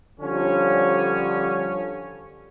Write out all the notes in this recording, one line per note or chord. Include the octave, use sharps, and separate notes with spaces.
D3 F3 G3 C#4